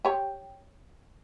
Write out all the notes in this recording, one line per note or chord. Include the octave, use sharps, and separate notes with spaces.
G4 C#5